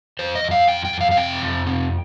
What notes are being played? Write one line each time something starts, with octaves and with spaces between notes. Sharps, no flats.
F2 C5
D#5
F2
F5
F2 G5
G5
F2
F5
F5
C3 G5
F2
C3